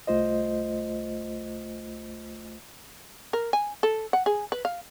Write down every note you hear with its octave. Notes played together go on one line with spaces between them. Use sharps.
C2 A3 F4 C5 D#5
A#4
G#5
A4
F#5
G#4
B4
F5